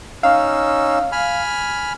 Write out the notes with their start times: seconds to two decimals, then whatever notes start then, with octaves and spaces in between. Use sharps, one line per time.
0.23 C#4 D#4 F5 E6
1.12 G#5 B5 F6